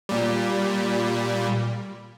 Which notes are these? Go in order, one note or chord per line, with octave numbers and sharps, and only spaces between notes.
A#2 G3